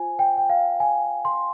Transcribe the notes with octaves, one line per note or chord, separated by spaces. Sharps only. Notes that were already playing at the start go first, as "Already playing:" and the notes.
Already playing: F4 C5 G#5
G5
G5
F5
G#5
C6